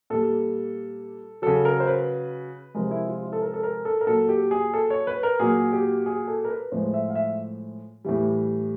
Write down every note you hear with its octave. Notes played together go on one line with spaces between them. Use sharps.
A#2 G3 A4
C#3 F#3 A4
A#4
C5
B4
C3 F3 G#3 A#4
E4
F4
E4
A4
A#4
A4
A#4
A4
A#4
A#2 F#3 A4
G4
G#4
A4
C#5
B4
A#4
A#2 F#3 G#4
G4
G#4
A4
A#4
B4
A2 F3 G#3 C5
E5
F5
E5
A2 E3 G3